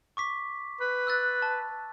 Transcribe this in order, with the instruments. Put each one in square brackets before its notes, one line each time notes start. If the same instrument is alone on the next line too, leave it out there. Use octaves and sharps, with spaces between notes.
[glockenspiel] C#6 D6 B6
[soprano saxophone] B4
[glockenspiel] E6 F#6 A6
A5